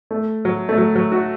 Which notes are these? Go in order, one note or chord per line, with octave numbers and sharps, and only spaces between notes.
A3
F#3
A3
F#3
F#3
F#4